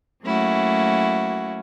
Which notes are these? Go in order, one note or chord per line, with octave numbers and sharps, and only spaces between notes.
F#3 A3 A#3 C#4 E4 F#4